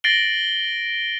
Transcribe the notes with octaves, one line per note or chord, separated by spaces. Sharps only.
A6 A#6 C7 D7 F#7 G7